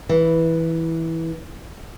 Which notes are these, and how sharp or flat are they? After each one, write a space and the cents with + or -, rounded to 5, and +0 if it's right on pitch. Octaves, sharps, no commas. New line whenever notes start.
E3 -10